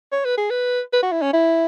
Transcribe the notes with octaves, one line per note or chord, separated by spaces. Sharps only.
C#5
B4
G#4
B4
B4
F#4
E4
C#4
E4